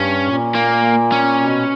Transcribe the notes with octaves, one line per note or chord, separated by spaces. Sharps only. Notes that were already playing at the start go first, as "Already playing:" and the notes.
Already playing: G2 C#4
A#2
A#3
C#4
B2